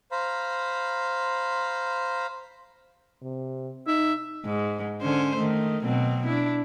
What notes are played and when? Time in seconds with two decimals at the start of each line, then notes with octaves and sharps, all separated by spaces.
0.12 C5 F5 A#5 B5
3.22 C3
3.87 D#4 E5
4.45 G#2
5.02 D3 C#4 C5
5.36 D#3 A3
5.84 B2 F#3 C4
6.26 D4 E4